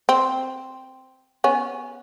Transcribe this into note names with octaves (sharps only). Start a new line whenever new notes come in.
C4
B3 C#4